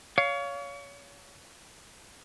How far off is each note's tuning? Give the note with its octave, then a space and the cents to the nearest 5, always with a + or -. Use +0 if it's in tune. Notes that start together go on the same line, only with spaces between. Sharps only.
C#5 +30 F5 +0